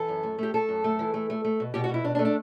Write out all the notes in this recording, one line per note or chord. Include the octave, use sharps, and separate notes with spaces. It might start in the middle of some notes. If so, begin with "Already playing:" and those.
Already playing: E3 A4
F#2
A3
A3 G4
A3 A4
F#2
A3
E3
A3
A3
A3
B2
B2 G4
F#4
B2
E4
B2 D4
D4
A3
D4